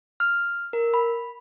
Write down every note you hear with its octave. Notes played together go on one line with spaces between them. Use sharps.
F6
A#4
B5